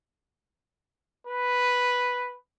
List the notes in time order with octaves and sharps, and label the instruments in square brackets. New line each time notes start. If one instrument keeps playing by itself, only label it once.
[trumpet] B4